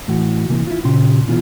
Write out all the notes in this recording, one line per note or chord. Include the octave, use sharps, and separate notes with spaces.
A2 E3 F#4
C3 E3 A#3
E4 F4
A#2 C#3 G4 C6
B1 B2 E3 F4 G4 G#4